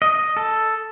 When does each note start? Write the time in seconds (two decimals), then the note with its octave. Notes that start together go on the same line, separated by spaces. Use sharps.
0.02 D#5
0.37 A4